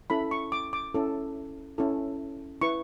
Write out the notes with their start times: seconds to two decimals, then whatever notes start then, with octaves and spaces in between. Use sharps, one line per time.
0.10 C#4 E4 A4 B5
0.31 C#6
0.52 D6
0.73 D6
0.94 C#4 E4 A4
1.78 C#4 E4 A4
2.62 E4 B4 C#6